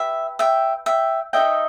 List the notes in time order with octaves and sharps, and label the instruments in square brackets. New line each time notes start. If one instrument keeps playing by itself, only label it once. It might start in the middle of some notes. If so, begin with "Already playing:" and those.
Already playing: [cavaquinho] G4 B4 E5
E5 G5
E5 G5
D#4 A4 D#5 E5 G5